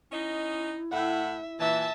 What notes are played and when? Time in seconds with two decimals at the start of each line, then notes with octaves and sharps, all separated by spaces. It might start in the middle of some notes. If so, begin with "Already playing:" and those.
0.12 C#4 D#4 E4 D#5
0.92 A2 E5 F#5
1.60 A#2 E3 E5 A5